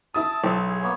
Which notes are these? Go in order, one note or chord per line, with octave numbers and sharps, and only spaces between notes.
E4 A5 D#6
B1
G#4
A#3 B3 C#5